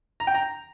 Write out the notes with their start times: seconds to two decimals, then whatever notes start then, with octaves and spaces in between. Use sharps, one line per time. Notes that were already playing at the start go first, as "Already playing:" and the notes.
0.20 A#5
0.27 G5
0.35 A#5